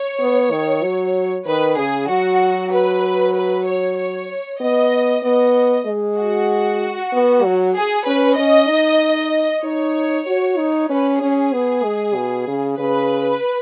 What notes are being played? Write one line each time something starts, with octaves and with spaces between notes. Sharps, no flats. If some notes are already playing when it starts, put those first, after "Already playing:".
Already playing: C#5
B3
D#3
F#3
D#3 B4
C#3 G#4
F#3 F#4
B4
B4
C#5
C#5
B3 D#5
B3 D#5
G#3
F#4
B3
F#3
G#4
C#4 B4
C#4 D#5
D#4
D#4 C#5
F#4
D#4
C#4 B4
C#4 G#4
B3
G#3
B2
C#3
C#3 B4